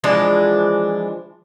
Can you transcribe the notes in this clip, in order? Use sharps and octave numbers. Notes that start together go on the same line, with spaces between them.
E3 F3 G#3 D4